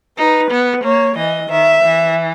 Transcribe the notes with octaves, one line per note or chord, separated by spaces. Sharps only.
D#4 B4
B3
A#3 C#5
E3 D#5
D#3 E5
E3